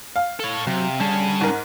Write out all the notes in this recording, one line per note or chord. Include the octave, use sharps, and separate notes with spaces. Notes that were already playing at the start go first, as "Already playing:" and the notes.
F5
A4 C#5
C3 F#3
D3 G3 C#4 G#4 A5
G#2 A#4